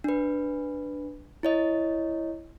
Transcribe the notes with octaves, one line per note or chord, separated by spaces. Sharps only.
D4 B4
E4 C#5 D#5